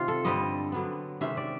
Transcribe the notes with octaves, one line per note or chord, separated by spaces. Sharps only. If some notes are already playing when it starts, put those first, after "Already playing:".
Already playing: C3 D#3 F4
A4
G2 D3 G3 C4 D#5
D3 F#3 B3
C3 D#3 G#3 C#4 E5
D5